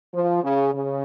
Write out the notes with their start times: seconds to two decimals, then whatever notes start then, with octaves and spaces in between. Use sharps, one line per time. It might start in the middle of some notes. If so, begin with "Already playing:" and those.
0.14 F3
0.43 C#3
0.73 C#3